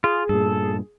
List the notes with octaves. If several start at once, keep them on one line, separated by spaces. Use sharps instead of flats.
F4 G#4
G2 A#2 A4